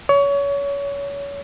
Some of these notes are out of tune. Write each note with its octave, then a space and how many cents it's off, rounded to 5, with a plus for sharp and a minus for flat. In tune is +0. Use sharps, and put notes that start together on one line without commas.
C#5 +25